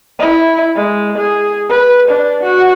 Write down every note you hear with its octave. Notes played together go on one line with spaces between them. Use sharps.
E4
G#3
G#4
B4
D4
F#4